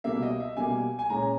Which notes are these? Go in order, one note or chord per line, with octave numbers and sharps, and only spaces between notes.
B2 G3 A#3 E5
D#5
E5
B2 G3 A#3 G#5
G#5
A#2 G#3 C#4 A#5